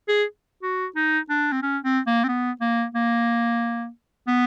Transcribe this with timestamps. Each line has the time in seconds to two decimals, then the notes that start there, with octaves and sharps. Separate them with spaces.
0.08 G#4
0.63 F#4
0.96 D#4
1.30 D4
1.52 C4
1.62 C#4
1.84 C4
2.07 A#3
2.24 C4
2.28 B3
2.61 A#3
2.95 A#3
4.28 B3